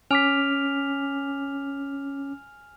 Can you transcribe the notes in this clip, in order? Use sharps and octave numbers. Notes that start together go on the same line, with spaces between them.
C#4 G#5 D6 F6 B6 F7